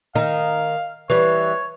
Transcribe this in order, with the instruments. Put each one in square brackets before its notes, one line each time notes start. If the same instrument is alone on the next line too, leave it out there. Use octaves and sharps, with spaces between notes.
[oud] D#3 D#4 [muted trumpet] F5
[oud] E3 G3 [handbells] B4 [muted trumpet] C#5